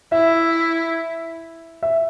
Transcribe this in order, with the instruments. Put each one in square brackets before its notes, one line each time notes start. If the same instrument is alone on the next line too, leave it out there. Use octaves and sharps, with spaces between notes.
[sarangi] E4 [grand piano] E5
[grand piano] E5